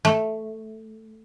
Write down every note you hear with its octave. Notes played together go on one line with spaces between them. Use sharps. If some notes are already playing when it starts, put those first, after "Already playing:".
A3